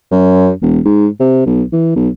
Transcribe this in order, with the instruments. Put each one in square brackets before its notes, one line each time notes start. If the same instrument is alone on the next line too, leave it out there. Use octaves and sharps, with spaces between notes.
[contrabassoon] F#2
E1
G#2
C3
B1
E3
B1